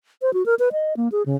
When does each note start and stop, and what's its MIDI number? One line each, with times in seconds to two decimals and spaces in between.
0.22 0.33 72
0.34 0.45 66
0.46 0.55 70
0.59 0.69 71
0.72 0.96 75
0.97 1.09 58
1.12 1.23 68
1.26 1.36 49